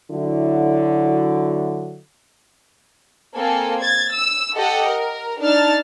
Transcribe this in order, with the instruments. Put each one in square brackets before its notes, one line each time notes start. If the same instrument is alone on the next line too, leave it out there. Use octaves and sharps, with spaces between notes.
[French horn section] D3 F#3 E4
[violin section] A#3 C4 A4 G#5
G#6 A6
E6
G4 A4 D#5 F#5 G5
A#4
D4 D#4 A5 F6 A6